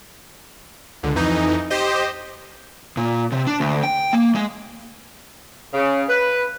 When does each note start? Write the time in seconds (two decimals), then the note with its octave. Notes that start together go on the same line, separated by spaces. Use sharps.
1.03 C#2 D3
1.15 F2 E3 D#4
1.70 G4 C5 D#5
2.97 A#2
3.32 C3
3.47 D4
3.60 D2
3.83 G5
4.13 A#3
4.35 G#3
5.73 C#3
6.09 B4